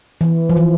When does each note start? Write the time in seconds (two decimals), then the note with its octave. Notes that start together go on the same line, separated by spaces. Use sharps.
0.21 E3
0.50 F3
0.57 E3